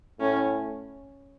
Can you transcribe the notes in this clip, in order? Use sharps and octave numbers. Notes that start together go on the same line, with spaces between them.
A2 C#4